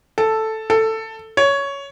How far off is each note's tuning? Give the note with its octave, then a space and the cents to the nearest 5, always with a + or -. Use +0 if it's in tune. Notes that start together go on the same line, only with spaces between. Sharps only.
A4 +0
A4 +10
C#5 +10